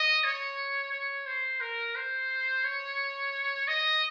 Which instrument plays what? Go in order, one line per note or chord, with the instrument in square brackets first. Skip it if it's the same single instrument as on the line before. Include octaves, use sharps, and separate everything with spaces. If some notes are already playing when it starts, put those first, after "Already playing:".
Already playing: [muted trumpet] D#5
C#5
C#5
C5
A#4
C5
C#5
D#5